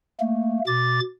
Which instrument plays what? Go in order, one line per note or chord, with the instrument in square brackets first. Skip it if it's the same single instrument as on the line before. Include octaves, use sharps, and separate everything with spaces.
[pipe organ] A3 A#3
B2 D6 A6